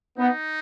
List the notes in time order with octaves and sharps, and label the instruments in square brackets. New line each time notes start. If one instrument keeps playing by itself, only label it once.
[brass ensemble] B3 [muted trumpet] D#4